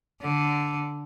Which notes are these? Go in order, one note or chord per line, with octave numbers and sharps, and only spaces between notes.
D3